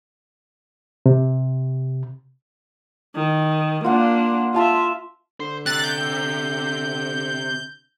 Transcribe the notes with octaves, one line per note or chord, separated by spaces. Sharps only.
C3
D#3
A#3 D4 F4 F#5
F4 E5 F5 A5 C6
D3 C5
C3 F#6 A6
G6